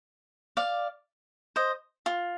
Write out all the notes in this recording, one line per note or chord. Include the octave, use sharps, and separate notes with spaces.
D5 F5
C5 D#5
F4